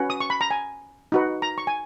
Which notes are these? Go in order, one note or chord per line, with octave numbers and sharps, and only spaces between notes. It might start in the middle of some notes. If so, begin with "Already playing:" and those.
Already playing: C#4 F#4 B4
D#6
C#6
B5
A#5
G#5
D#4 F#4 B4
A#5
C#6
G#5